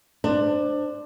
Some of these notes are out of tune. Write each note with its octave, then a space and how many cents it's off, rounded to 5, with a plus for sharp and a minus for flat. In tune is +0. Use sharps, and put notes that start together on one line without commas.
D4 +15 C5 +0